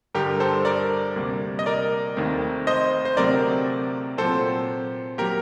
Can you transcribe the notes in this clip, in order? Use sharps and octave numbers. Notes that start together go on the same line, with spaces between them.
G2 D3 G3 G4 A#4
A4 C5
A#4 D5
D2 C3 G3 A#3
D#5
A#4 D5
D#2 D#3 A3 C4
C5 D#5
C5
D2 C3 F#3 A3 C4 A#4 D5
A#2 F#3 C4 A4 C5
F#3 A#3 G4 A#4